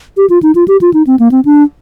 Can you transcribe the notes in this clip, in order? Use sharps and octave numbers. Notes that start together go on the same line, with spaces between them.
G4
F4
D#4
F4
G4
F4
D#4
C4
A#3
C4
D4